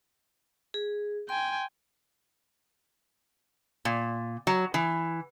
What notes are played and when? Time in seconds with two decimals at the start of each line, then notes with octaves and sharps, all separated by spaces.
0.74 G#4
1.29 G5 G#5 C6
3.85 A#2
4.47 F#3
4.74 E3